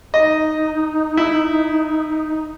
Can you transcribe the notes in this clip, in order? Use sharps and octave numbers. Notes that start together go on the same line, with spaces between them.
D#4 D#5
E4